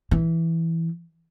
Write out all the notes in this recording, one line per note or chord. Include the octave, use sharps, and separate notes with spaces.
E3